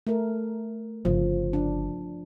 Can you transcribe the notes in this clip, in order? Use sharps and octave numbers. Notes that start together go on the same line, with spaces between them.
A3 A#4
G1 C#3 F3
D4